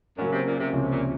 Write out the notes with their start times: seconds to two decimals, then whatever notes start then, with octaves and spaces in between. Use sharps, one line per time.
0.18 F#2 C#3 F#3 A#3 C#4
0.32 C3
0.47 A#2
0.60 C3
0.73 C#2 C3 F3 A#3 C#4
0.92 A#2